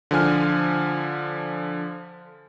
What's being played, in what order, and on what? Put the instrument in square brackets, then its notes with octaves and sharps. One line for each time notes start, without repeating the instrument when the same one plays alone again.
[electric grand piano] D3 F3 G#5 F6